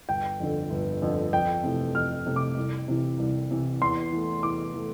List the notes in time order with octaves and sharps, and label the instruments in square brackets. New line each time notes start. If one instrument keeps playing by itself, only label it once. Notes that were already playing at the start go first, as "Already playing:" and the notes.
[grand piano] G1 G5
F2 D3
G1
F2 D3
F2 G5
C3 E3 A3
F2 F6
C3 E3 A3
D6
C2
C3 E3
C2
C3 E3
E2 C6
E3 A3
E2 D6
E3 A3